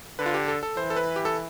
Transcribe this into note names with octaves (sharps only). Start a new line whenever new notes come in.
D3 B4
F4
G4
A4
A4
E3 C5
A4
B4
G4
A4